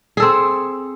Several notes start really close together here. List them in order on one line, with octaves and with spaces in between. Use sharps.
G#4 A4 C4